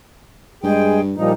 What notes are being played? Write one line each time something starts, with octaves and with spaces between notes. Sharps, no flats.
G2 G#3 G#4 G5
A#2 F3 G3 D#4